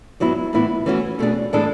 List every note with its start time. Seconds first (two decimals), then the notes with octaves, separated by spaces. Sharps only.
0.20 G#2 F#3 B3 E4
0.53 A2 E3 B3 E4
0.86 E3 A3 C#4 F#4
1.19 B2 A3 D4 G#4
1.53 A2 E3 G#3 D4 A4